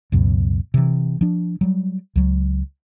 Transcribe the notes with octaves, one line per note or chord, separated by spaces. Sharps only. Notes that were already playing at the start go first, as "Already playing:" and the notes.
C#2 F#2 B2
C3 E3
F3 D4
F#3 G3
C#2 F#3